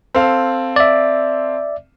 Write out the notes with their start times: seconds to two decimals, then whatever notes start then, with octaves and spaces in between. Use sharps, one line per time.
0.15 C4 A4 F5
0.76 D5 E5